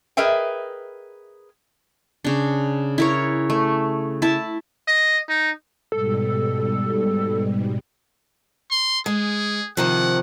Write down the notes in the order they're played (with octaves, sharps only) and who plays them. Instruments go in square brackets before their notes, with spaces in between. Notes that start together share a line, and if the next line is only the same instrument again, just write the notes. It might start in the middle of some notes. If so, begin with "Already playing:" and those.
[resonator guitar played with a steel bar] G#4 A#4 B4 D#5 E5 G5
[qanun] C#3 D4
E4 A#4 C#5
A3
E4 A5
[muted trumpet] D#5
D#4
[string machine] G#2 B2 G3 [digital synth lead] A4
[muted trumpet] C6
[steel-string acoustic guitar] G#3 [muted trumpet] G#4
[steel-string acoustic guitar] C3 D#3 F3 [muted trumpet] F#5